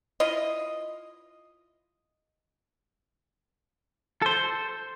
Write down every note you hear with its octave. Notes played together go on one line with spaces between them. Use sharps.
E4 F4 D#5
A4 C5